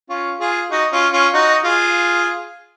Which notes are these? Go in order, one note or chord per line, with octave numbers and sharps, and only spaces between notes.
C#4 F4
F4 G#4
D#4 F#4
C#4 F4
C#4 F4
D#4 F#4
F4 G#4